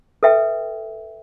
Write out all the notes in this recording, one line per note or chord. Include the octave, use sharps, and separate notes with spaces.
A4 B4 E5 G5